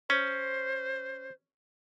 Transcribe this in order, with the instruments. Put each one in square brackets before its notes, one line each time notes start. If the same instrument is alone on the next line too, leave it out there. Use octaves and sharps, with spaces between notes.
[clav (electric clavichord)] C#4 [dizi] C5